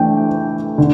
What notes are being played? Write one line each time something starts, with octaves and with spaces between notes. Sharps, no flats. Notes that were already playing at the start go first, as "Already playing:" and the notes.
Already playing: E3 A3 D4 G5
D3